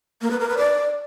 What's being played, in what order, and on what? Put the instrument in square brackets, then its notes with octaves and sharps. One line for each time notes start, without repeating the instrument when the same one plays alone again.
[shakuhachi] A#3
B4
A#4
B4
D5